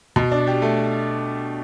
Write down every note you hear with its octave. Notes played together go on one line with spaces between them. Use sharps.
B2
D4
G4
A3